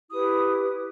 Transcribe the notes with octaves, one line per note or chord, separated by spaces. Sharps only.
E4 G4 B4 D#6